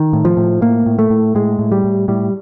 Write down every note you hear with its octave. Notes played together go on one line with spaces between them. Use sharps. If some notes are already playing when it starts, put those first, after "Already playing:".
Already playing: D#3
A2
F3
A2
A2 A#3
A2
A3
A2
A2 G#3
A2
G3
A2
A2 G3